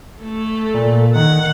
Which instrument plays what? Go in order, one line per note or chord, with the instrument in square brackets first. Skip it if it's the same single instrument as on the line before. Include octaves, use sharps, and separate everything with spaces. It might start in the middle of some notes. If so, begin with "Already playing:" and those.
[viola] A3 A4
[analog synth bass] A#2
[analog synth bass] D#3 [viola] F#5